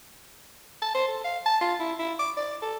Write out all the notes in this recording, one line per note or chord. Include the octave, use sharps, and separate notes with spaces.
A5
C5
A4
F5
A5
F4
E4
E4
D6
D5
A4